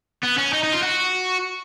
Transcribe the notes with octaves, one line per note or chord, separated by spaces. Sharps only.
B3
C#4
D#4
D#4
F4
F#4